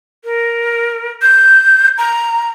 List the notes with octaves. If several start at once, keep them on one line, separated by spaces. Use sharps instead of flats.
A#4
G6
A#5